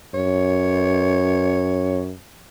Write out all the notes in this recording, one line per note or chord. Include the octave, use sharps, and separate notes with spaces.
F#2 C#5